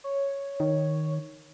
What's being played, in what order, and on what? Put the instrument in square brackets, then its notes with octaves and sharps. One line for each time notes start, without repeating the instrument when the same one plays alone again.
[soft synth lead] C#5
[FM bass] D#3